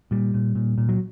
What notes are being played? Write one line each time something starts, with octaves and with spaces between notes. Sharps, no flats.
A#2 G3
A#2
A#2
A#2
F#3